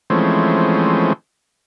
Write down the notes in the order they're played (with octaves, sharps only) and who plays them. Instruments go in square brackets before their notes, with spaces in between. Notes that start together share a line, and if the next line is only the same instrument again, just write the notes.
[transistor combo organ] E3 F3 G#3 A3 C4 C#4